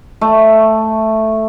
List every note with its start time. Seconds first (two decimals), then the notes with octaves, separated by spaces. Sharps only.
0.21 A3